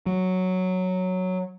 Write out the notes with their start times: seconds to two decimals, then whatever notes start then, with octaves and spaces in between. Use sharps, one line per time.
0.06 F#3